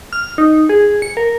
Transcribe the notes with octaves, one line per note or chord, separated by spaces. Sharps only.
F6
D#4
G#4
C#7
A#4